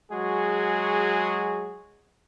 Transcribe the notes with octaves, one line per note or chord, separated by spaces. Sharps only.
F#3 G#3 F#4 G#4